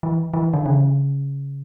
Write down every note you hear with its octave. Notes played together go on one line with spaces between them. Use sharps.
E3
E3
D3
C#3